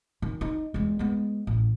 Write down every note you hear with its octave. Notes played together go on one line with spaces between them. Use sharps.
D#3
D#4
E2 G#3
G#3 B3
A1